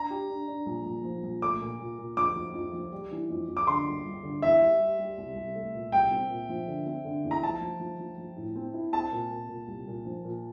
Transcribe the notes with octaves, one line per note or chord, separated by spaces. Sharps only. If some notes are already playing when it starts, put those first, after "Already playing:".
Already playing: D4 A#5
G4
D4
D4
A#1
A#1
F3
A#1
A3 D6
A#2
A#2
A#2
F2 D6
F3
F2
F3
G3
E3
F2
F2
D6
D3 C6
G1
G1
D3
E2 E5
G3
G3
G3
C2
C2
A3
A#2
C2 G5
C4
A#2
F3
D3
C4
D3
E2
A#5
F3 A5
F3
F3
F3
F3
A2
C4
E4
C4 A5
A#2
A#2
A#2
C2
A#2
F3
A#2